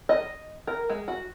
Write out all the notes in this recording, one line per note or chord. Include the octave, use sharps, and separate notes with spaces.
D#5
A#4
G#3
F#4